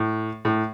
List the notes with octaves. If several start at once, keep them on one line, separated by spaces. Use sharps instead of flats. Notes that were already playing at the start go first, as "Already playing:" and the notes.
Already playing: A2
A2